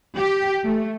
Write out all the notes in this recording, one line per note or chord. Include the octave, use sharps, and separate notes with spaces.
G4
A3